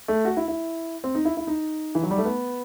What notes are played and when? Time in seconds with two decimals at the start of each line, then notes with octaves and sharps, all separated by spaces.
0.08 A3
0.25 F#4
0.37 E4
0.48 E4
1.04 C4
1.15 D#4
1.25 E4
1.37 E4
1.47 D#4
1.95 E3
2.03 F#3
2.11 G3
2.18 A3
2.25 B3